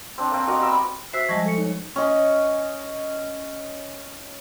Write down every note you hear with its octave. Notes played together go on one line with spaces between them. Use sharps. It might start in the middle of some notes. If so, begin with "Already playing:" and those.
C4 D4
A#3 C4
F#4 A#4 D#5 F5
G3 B3 E6
F#4 C5 E5 E6 B6 C7
F3 G3 G#3 D#5 A5 C#6
A4 C#7
D#4 C#5
C#4 D#5